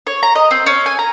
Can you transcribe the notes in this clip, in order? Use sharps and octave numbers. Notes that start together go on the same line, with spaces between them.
C#5
A#5
D#5
C4
C#4
G#5
A#5